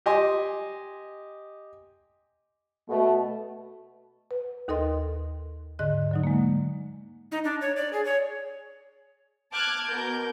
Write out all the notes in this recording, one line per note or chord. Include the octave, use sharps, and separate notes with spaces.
G4 D#5 G#5 C6
B2 A3
B4
D#2 D#4 A4 A#4 D#5 C6
G#2 D3 D#5 F#6
D3 F#3 D#4
G#3 A#3
D#4
D4
C#5
D5
G#4
C#5
A5 D6 F6 F#6 G#6
B2 A#4 G6